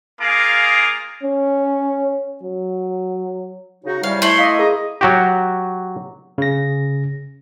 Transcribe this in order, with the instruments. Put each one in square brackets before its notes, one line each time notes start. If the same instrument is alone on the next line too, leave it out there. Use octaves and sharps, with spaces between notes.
[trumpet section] A#3 F4 G#4 A#5 D6
[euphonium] C#4
F#3
[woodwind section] C#3 D#4 [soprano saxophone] F#4
[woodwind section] C3 E3 G3 [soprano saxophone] C#5 [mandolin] F5
[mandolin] A3 E4 [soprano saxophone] C6
[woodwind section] D#5 [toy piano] F5 D6
[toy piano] G#4 A#4 [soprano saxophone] A#5
[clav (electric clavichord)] F#3 F#4 G4
[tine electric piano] C#3 A#6